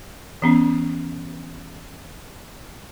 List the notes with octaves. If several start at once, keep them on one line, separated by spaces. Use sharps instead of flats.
E3 B3 C#4